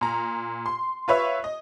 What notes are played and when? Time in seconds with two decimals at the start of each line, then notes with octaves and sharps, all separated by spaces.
0.01 A#2 A#5
0.66 C6
1.08 F4 B4 C#5 E5
1.44 D#5